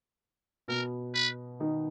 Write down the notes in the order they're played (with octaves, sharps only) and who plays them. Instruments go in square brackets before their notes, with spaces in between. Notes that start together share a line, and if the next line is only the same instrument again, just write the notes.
[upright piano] B2 B3 [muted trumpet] A#4
[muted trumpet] B4
[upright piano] D#3 D#4